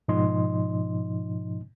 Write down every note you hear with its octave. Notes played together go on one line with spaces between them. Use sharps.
G#2 B2 F3 D#4 D#5 C6